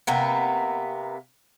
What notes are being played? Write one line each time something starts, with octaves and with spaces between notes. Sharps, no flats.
C3 A#3 B3